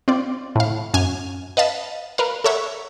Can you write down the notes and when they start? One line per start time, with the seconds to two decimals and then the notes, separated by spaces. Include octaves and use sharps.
0.08 C4 F4 D5
0.56 A2 F5
0.94 F#2 G#5 F6
1.57 B4 D#5 F5 A5 B5
2.18 A#4 B4 F5
2.44 A4 A#4 C#5 E5 F#5